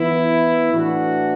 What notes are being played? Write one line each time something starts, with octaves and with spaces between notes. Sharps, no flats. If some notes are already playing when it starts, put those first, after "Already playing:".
Already playing: E3 B3 E4
A2 E3 D4 F#4